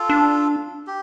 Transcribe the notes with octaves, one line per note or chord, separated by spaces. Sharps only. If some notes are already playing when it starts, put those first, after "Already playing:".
Already playing: F4 A4
D4
G4